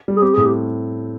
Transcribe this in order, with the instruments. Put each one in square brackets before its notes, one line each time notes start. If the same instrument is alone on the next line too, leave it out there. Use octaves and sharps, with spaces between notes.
[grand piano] G3
[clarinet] G#4
[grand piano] C4 [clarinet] G4
[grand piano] A2 [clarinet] G#4
[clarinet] G4